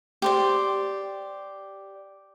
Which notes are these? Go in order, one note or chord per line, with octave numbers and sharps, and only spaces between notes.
G4 C5 D5